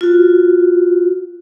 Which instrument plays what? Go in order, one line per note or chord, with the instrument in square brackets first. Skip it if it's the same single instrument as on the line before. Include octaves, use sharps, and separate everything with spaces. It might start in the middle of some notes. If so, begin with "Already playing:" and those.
[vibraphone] F4 F#4